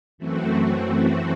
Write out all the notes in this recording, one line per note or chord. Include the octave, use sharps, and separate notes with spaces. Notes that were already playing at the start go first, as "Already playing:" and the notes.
F#2 E3 A3 C4 F#4